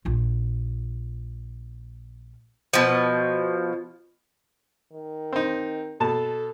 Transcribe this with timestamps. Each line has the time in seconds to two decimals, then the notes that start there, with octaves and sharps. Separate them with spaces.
0.05 A#1 F4
2.73 B2 F3
4.93 D#3
5.33 C4 D#4
6.00 B2 A4 A5